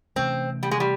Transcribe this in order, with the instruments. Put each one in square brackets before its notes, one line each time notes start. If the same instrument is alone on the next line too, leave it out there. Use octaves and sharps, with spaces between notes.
[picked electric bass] C3 E3 A3 C#4 [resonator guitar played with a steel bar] C4
[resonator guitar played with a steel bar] G3
G#3
G3